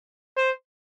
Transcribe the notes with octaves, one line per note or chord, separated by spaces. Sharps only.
C5